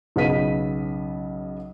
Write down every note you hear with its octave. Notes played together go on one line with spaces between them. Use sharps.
B1 C#3 B3 D#5 B6 D#7